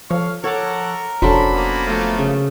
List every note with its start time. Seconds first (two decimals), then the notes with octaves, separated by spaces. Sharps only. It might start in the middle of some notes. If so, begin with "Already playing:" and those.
0.11 F3 A4 C#5 F5
0.44 A4 A#4 C#5 F#5 A#5 D6
1.22 F1 F#3 C#4 D4 A4 C5 B5
1.53 A#3 B3
1.87 F3 A3
2.18 C#3